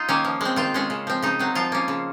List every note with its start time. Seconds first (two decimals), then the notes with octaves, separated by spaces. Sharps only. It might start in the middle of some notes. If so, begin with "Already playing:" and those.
Already playing: D#4 F4
0.09 D#3 A#3 C#4
0.25 F3
0.41 G#3 C4
0.56 D#3 F4
0.74 G#3 C#4
0.90 C#3
1.07 F3 C4
1.22 C#3 D#4
1.39 F#3 C4
1.55 F3 F4
1.72 A#3 C#4
1.88 C#3